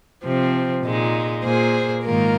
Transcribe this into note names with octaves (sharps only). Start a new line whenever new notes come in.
C3 F3 C4
A#2 G#3 D#4
A#2 A#3 G#4 C5
G#2 D#3 A#3 F4 A#4